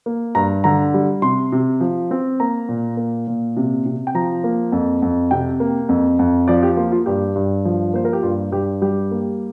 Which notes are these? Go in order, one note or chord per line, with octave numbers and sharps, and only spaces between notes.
A#3
G2 A#5
D3 A#5
G3
C3 C6
C3
F3
C4
A#3 A#5
A#2
A#3
A#2
C3
C3
G5
F3 A#5
A#3
F2
F2
C3 G5
A#3
F2
F2
F3 D5
G4
A#3 F4
F4
G2 G4
G2
F3
A#3 C5
A#4
G4
G2 F4
G2 G4
G3 G4
A#3